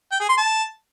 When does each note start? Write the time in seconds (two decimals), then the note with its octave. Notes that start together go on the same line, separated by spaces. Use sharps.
0.12 G5
0.20 G#4
0.29 C6
0.38 A5